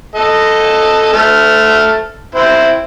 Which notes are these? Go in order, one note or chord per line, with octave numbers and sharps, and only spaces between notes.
A4 D#5
A3 A5 F6
C4 E4 C5